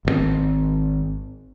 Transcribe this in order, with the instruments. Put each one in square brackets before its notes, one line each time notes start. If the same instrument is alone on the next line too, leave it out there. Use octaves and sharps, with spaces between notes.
[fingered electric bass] G#1 B2 C4